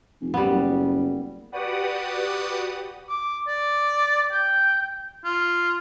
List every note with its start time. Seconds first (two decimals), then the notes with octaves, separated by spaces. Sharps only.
0.21 F1
0.34 F#2 G3 B3
0.50 F#1
1.52 F#4 G4 B4 D5 F#5 D#6
3.09 D6
3.47 D5
4.32 G5
5.24 F4